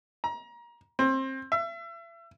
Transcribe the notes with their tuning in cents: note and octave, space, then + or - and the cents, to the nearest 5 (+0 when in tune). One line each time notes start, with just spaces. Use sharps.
A#5 +30
C4 +25
E5 +35